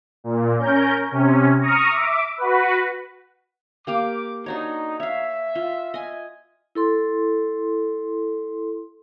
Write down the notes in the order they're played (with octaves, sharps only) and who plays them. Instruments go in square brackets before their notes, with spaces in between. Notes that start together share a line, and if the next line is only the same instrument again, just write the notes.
[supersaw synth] A#2
C#4 A#4 G6
C3 C#4
A#5 C#6 D#6 F6
E5 D6
F#4 B4
[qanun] A#3 G4 F5 [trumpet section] D6
[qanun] D4 F#4 C#5 [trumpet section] D#4
[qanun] C#5 F5 [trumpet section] E5
[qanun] F4
D#5 G#5
[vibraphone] E4 A4 C6